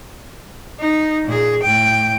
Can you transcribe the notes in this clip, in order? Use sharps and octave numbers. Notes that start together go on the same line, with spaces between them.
D#4
A#2 G#4
A2 G5